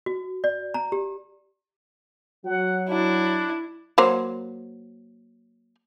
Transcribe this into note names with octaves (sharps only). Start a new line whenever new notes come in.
F#4
D5
A#5
G4
F#3 F#5
D4 E4
F#3 A#3 C5